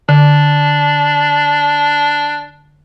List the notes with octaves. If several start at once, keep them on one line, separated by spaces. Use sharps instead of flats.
D3 D4